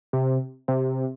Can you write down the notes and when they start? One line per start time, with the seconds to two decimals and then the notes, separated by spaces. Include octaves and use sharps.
0.13 C3
0.68 C3